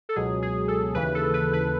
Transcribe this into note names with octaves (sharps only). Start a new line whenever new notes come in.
A4
C#2 B2 F#3 G#4
G#4
A4
D#2 C#3 E3 B4
A4
B4
B4